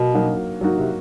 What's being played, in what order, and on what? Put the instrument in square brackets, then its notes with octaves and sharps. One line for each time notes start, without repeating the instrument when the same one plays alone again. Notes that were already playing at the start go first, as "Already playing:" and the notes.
Already playing: [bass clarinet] B2 [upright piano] F#3 A#3
[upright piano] F#3 A#3 D#4 F#4
F#3 A#3 D#4 F#4
[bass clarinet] C3